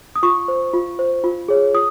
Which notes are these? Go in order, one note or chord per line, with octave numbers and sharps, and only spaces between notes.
D#6
F4 C#6
C5
F4
C5
F4
G#4 C#5
F4 D#6